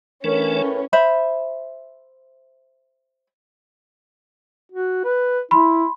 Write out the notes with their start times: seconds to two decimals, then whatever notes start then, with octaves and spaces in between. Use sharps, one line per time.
0.24 A2 E3 A3 C#4 D4 A#4 B4
0.93 C5 E5 B5
4.72 F#4
5.04 B4
5.51 E4 B5 C6